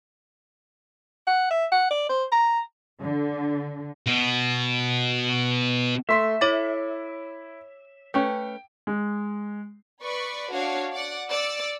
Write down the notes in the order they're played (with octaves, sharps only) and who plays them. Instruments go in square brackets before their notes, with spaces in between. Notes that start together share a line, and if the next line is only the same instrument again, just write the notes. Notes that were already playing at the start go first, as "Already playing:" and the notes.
[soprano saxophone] F#5
E5
F#5
D5
C5
A#5
[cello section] D3
[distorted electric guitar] B2 B3
[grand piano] A3 C6 B6 [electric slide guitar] E5
[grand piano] E4 [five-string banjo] A4 [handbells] C#5 D6 A6
[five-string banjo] A3 C#4 B4 [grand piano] G5
[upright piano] G#3
[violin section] B4 D5 B5 C#6
D4 F#4 C#5 F5
D5 F#5
D5 E6 C#7